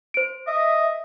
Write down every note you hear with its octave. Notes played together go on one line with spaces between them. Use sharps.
C5 D7
D#5 E5